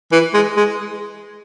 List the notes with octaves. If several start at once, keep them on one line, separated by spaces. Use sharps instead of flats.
E3
G#3
G#3